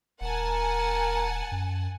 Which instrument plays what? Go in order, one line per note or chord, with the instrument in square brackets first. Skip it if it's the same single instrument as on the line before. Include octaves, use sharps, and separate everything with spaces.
[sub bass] D#1 [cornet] A#4 [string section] F#5 G#5 A5
[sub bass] F#2